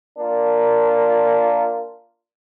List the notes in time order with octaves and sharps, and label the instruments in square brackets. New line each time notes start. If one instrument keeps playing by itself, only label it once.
[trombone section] A#3 D4 F4 A#4